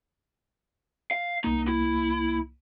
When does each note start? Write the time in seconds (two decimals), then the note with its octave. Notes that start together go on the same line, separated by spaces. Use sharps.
1.11 F5
1.44 C2 A#3 D#4
1.68 E4